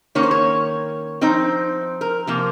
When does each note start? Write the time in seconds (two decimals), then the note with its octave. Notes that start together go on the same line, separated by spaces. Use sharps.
0.15 D#3 A#3 C#4 C#5
0.23 C5
0.31 C#5
1.21 F3 C4 D#4
2.01 A#4
2.27 C3 F3 A#3